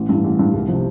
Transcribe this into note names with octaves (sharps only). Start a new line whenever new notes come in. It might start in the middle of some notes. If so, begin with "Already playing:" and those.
Already playing: A1
G2 E3
A1
G2 E3
C2
C3 F3